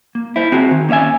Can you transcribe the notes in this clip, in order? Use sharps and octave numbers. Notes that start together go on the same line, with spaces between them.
A#3
E4 C5
C4 F#4 G#4
D#3
A#3 C#4 C5 E5 G#5